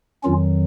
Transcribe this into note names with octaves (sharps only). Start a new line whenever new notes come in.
F2 D#3 F#3 C#4 F4